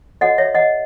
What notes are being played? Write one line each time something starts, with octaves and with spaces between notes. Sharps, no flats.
F#4 A4 C#5 D#5 F#5
C#5 E5
D#5 F#5